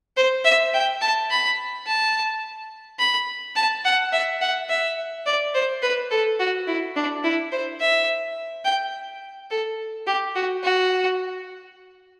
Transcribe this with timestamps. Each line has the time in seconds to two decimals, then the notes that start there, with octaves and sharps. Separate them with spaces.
0.17 C5
0.45 E5
0.74 G5
1.01 A5
1.30 B5
1.87 A5
2.99 B5
3.56 A5
3.85 F#5
4.12 E5
4.41 F#5
4.69 E5
5.26 D5
5.54 C5
5.82 B4
6.11 A4
6.40 F#4
6.67 E4
6.96 D4
7.24 E4
7.52 C5
7.80 E5
8.65 G5
9.50 A4
10.07 G4
10.35 F#4
10.63 F#4